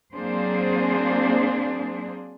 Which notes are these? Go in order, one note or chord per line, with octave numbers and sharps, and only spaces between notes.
F#3 A#3 C4 D4 G#4 C5